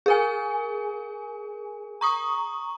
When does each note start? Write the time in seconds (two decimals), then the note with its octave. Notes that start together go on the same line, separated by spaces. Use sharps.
0.06 G#4 A#4 G#5
2.01 A#5 C#6 D#6